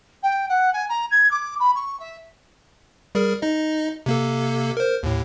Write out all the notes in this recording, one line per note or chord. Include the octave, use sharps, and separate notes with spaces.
G5
F#5
G#5
A#5
G#6
D6
B5
C#6
E5
G3 G#4 A#4
D#4 D#5
C3 A#3 A4
A#4 C5
D#2 A2